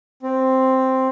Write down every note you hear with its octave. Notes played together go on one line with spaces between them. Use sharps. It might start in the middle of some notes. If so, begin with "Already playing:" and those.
C4